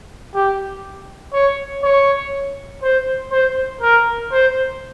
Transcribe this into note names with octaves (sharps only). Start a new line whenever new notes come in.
G4
C#5
C#5
C5
C5
A#4
C5